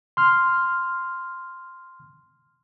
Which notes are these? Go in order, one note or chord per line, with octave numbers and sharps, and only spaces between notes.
C6 F6